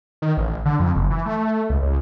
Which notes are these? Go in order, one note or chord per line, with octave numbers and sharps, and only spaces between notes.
D#3
A1
D3
F2
F#1
E3
A3
C#2
C#2